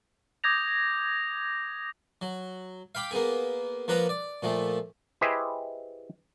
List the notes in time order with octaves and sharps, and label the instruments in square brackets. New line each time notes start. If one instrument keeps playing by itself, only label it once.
[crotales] D6 D#6 G6 G#6 A#6 F7
[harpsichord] F#3
F5 G5 B5 D6
A#3 B3 G#4
F3 A#3 B4 F#5 A#5
D5
A#2 F3 A3
[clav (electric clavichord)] E4 G4 G#4 B4 C5 D#5